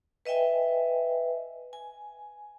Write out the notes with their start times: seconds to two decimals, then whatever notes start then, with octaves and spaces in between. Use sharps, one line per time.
0.25 B4 D#5 E5 G5 G#5
1.73 G#5